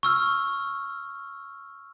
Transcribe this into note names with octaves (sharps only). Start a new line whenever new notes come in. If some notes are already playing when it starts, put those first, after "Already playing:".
C#6 E6 F6